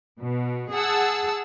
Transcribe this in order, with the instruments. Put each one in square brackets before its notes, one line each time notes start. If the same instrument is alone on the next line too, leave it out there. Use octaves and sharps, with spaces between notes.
[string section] B2
G#4 F#5 A5 E6